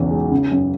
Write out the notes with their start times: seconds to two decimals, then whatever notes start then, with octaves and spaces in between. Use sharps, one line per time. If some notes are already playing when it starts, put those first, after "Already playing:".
Already playing: B1 E2 C#3
0.11 G#3
0.31 C#3
0.52 F#2